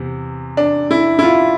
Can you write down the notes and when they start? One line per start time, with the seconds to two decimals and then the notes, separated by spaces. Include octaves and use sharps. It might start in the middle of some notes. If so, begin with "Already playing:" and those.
Already playing: E2 C3
0.57 D4
0.91 E4
1.19 E4
1.23 F4